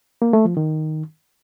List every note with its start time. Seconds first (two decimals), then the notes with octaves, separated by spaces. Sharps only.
0.22 A#3
0.33 A3
0.45 F3
0.57 D#3